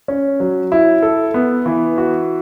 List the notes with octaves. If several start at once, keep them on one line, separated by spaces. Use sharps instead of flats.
C#4
F#3
E4
A4
B3
E3
F#4